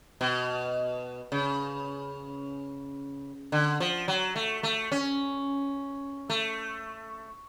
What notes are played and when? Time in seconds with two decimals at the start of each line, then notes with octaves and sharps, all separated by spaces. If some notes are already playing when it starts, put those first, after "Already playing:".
0.21 B2
1.32 C#3
3.52 D3
3.80 F3
4.08 F#3
4.36 A3
4.63 A3
4.92 C#4
6.30 A3